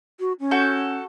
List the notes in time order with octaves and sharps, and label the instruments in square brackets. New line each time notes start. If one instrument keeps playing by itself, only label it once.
[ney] F#4
C#4
[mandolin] F#4 A4 G6